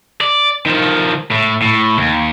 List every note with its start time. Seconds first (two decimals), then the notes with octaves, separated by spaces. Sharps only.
0.21 D5
0.66 D#3 F3
1.31 A2
1.62 A2
1.98 D#2